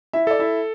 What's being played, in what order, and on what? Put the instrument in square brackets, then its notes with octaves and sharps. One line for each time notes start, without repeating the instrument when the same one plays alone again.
[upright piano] E4 E5
[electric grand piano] A4 [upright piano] D5
[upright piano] E4 E5